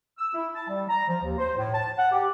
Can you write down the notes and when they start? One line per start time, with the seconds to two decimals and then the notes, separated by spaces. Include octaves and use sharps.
0.18 E6
0.34 E4
0.55 A5
0.69 G3
0.88 A#5
1.08 F3
1.23 D#2
1.38 C5
1.57 A2
1.73 A5
1.98 F#5
2.12 G4